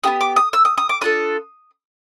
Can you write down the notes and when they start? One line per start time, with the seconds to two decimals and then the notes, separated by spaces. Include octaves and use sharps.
0.04 B3 E4 G4 D#6
0.21 D6
0.36 D#6
0.53 E6
0.65 D#6
0.78 D#6
0.89 D6
1.01 D4 F4 A4 D#6